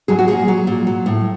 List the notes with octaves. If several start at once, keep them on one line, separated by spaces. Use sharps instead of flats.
F#3 G#4
F#4
A#2 G#4
F#3
A#2
F#3
A2